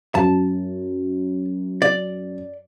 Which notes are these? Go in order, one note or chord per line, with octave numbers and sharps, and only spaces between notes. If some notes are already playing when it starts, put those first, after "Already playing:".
F#2 A5
D5